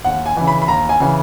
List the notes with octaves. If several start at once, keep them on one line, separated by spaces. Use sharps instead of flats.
D#2 F#5
G#5
C#3 E3
B5
B5
D#2 A#5
G#5
C#3 E3